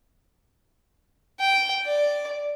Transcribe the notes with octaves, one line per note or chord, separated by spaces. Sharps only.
G5
D5